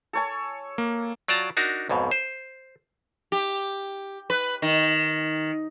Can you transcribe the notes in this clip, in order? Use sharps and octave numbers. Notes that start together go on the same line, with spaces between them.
A4 C#5 G#5
A#3
F#3 F4 D5 G5 A5 A#5
D4 D#4 F#4 A#4
B1 F2 G#2 B2
C5
G4
B4
D#3